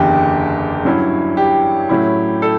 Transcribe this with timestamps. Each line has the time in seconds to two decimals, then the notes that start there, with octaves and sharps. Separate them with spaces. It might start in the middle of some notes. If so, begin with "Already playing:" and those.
Already playing: F#1 E2 D3 G4
0.85 G2 F#3 C#4 E4
1.37 G4
1.89 A2 F#3 C#4 E4
2.42 A4